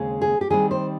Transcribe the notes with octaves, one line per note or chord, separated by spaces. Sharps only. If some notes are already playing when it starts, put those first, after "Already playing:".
Already playing: D#2 C#3 G#3 C4
G#4
G4
D#3 G3 C4 G#4
C5